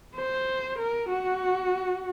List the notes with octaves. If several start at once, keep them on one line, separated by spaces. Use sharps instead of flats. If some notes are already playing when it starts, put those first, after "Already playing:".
C5
A#4
F#4